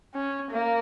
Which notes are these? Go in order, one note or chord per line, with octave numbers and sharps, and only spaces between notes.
C#4
A#3